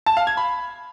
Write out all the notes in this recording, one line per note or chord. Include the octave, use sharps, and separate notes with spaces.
A5
F5
G#6
B5